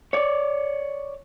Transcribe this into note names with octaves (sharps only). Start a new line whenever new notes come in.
C#5 D5